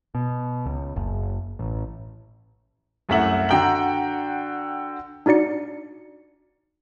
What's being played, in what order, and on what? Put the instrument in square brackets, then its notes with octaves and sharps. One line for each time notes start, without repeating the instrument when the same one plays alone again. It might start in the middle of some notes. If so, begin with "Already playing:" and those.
[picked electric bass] B2
C#2
F#1
A1
[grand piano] C2 F#2 A3 E5 F#5 F#7
D3 F#4 G5 A#5 F#7
[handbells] D4 D#4 F#4 D5 C#7